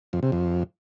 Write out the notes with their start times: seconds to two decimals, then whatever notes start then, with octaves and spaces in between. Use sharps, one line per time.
0.13 F2
0.23 C3
0.32 F2